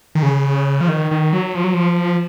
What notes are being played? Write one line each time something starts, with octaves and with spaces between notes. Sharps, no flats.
D#3
C#3
F3
D#3
D#3
F#3
F3
F#3
F3